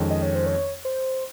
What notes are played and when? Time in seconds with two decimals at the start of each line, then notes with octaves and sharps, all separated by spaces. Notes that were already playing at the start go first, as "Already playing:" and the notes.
Already playing: F2 D#3 G#3 C#4
0.10 D#5
0.22 C#5
0.35 C5
0.46 C#5
0.85 C5